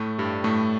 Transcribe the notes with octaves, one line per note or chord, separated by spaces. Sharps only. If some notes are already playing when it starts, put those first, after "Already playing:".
Already playing: A2 A3
G2 G3
A2 A3